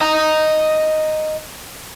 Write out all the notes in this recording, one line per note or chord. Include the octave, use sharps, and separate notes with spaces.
D#5 A#5